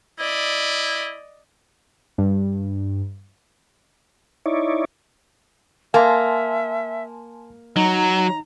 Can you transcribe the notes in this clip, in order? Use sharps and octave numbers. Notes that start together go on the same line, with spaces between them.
E4 D5 D#5
G2
D#4 E4 C#5 D5
A#3 E5 G#5 A5 C6
F#3 D#4 A#5